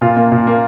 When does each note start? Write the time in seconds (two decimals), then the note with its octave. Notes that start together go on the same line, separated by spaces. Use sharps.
0.01 A#2 F4
0.16 A#3
0.32 A#2
0.47 A#3